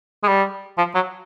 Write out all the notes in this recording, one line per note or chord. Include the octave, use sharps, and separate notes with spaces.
G#3
G3
F3
F#3